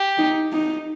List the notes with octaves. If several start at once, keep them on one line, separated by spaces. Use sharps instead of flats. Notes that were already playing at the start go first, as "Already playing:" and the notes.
Already playing: G4
D#4
D#4